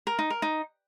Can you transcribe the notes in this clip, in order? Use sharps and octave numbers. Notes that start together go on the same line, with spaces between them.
A#4
D#4
A#4
D#4